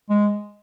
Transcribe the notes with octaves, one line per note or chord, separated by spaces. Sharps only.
G#3